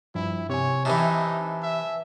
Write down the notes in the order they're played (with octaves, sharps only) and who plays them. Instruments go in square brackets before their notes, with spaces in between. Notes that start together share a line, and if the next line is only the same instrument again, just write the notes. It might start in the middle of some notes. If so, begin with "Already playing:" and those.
[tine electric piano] G2 F3 [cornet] E4
[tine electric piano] C3 G#5 [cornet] C#5
[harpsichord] C3 E3 [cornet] D#4 [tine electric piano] B4 G#5 A5
[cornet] E5